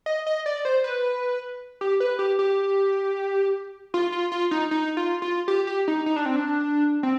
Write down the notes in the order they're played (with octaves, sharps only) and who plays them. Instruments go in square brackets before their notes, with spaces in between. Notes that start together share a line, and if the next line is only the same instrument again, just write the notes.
[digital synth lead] D#5
D#5
D5
C5
B4
G4
B4
G4
G4
F4
F4
F4
D#4
D#4
F4
F4
G4
G4
D#4
D#4
D4
C4
D4
C4